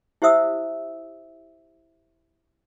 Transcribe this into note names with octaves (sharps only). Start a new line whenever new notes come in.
E4 G4 C5 E5 D#6 E6